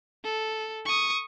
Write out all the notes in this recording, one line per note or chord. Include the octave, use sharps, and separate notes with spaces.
A4
C#6 D#6